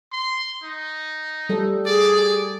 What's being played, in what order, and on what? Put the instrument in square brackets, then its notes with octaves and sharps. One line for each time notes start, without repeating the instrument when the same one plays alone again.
[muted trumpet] C6
D#4
[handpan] G3 A4
[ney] G#4 [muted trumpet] D5